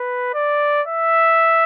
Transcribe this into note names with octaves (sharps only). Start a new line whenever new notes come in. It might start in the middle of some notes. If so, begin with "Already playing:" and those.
Already playing: B4
D5
E5